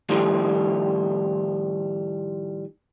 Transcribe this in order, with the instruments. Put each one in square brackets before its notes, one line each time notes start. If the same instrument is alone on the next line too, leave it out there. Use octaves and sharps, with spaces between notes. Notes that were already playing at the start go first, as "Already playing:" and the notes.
[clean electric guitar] A2 D#3 F3 G3